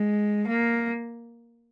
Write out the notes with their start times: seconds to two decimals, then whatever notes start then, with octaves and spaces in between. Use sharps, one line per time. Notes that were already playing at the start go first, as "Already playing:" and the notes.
Already playing: G#3
0.47 A#3